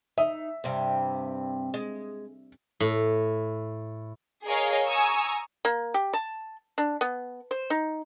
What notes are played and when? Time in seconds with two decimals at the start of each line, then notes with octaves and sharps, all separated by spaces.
0.18 D#4 E5
0.64 G2 C3
1.74 G#3
2.80 A2
4.45 G#4 A#4 C#5 D#5 F5
4.87 G#5 A#5 C#6 D#6 E6
5.65 A#3
5.94 G4
6.13 A5
6.78 D4
7.01 B3
7.51 C5
7.70 D#4